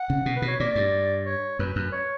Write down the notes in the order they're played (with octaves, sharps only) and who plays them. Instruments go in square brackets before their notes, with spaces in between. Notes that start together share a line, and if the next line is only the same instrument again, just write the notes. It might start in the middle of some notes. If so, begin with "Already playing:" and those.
Already playing: [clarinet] F#5
[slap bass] C#3
B2
[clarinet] B4
[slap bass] B2
[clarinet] C#5
[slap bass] A#2 [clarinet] D5
[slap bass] G2
[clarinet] C#5
[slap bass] F#2 [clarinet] B4
[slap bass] F#2
[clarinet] C#5